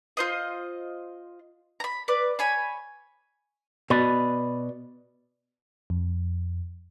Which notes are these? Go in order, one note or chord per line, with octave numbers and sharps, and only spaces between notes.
F4 C5 D#5
A#5 B5
B4 D5
C#5 G#5 B5
B2 B4 D5 B5
F2